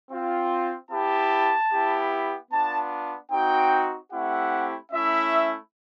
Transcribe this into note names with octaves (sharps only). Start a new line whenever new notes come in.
C4 F4
B3 E4 G4 A5
B3 E4 G4
B3 D4 F4 A5
C4 D#4 F#4 G5
A3 C4 E4 G4 F#5
A3 C#4 E4 E5